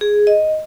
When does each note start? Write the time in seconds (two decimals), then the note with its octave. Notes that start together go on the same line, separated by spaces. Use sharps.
0.01 G#4
0.27 D#5